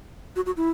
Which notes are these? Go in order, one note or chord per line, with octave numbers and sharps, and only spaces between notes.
F#4
F#4
E4